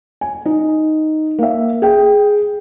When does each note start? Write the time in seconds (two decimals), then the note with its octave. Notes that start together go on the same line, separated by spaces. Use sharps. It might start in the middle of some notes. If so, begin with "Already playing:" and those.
0.21 G#5
0.45 D#4
1.39 A#3 E5
1.82 G#4 G5